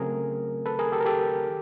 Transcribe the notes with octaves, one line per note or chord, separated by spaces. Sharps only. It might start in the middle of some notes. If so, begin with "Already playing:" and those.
Already playing: C#3 F#3 A3 C4 G#4 A#4
A4 B4
G#4 A#4
G4 A4
A#4
G4 A4
D#3